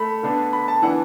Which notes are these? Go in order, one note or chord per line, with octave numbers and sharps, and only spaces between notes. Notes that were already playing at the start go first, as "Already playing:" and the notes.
Already playing: A3 B5
D3 B3 D4
B5
A5
E3 B3 D4 F#5